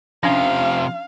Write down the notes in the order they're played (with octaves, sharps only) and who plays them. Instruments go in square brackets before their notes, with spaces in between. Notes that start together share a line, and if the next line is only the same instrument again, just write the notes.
[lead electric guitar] C3 F3 [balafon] C#4 D4 [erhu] F5